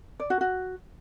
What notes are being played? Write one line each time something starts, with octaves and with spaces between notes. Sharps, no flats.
D5
F#4
F#4